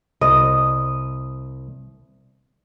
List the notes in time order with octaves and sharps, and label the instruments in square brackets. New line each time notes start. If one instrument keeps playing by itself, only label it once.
[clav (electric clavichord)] C2 [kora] D#5